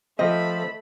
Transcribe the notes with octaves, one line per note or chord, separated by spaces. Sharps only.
F3 A3 C4 D#5 B5